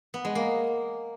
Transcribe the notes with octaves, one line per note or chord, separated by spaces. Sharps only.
B3
G#3
A#3